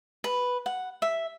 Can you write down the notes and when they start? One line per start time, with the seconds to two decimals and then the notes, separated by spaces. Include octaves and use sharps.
0.24 B4
0.66 F#5
1.02 E5